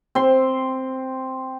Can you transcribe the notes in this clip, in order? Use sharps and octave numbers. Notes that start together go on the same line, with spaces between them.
C4 C6